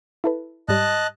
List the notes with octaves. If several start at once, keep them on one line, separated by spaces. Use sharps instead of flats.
E4 A4 B4
G#2 G3 D#5 A5 F#6